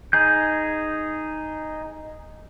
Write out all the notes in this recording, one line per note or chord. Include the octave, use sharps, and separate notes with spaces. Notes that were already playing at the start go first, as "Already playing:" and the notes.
D#4 G#4 G6